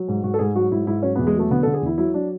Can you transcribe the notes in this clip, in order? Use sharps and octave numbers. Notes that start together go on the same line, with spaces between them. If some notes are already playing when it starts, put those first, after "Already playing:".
Already playing: F#3
G#2
G#2 F#4
A4
G#2 G#4
F#3 F#4
G#2 E4
G#2 E4
F#3 C#4
B3
E2
G#3
F#3 A3
D3 B3
D3 A4
G#4
E2 E4
F#3 E4
F#3 D4